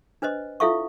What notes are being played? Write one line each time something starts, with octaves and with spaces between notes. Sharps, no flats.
D4 B4 C5 D#5
E4 F4 A4 E5 F5 C#6